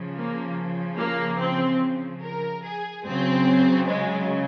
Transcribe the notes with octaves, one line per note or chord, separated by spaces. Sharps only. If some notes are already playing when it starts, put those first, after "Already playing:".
Already playing: C#3 F3
A#3
A#3
C4
A#4
G#4
C#3 F#3 C4
G#3